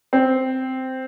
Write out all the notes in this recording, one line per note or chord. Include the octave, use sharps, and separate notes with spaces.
C4